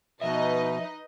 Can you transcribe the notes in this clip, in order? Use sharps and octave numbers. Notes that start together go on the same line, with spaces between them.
B2 F3 D#4 B4 D#5 E5